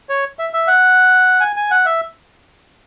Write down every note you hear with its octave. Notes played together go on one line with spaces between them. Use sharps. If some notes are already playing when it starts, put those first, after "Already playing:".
C#5
E5
E5
F#5
G#5
G#5
F#5
E5